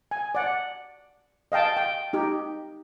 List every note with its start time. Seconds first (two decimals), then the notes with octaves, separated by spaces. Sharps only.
0.11 G#5
0.35 D5 F#5
1.52 D#5 F5 G5 A5
1.77 G5
2.13 D#4 G4